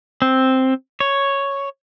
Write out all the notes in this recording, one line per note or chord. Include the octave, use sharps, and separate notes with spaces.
C4
C#5